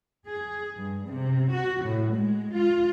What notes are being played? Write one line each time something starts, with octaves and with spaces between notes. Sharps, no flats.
G#4
G2
C3
F#4
A2
G#3
F4